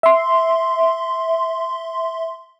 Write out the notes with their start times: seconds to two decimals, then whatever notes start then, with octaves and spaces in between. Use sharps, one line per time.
0.03 E5 C6